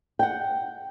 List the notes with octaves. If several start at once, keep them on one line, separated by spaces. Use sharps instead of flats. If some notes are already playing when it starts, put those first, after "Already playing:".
F#5 G5